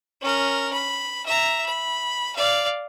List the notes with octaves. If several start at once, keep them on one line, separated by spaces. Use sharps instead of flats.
C#4 A#4
B5
E5 A#5
B5
D5 F5